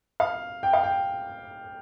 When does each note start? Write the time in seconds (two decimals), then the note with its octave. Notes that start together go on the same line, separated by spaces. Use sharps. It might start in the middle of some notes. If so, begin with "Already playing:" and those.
0.20 F5
0.63 G5
0.73 F5
0.83 G5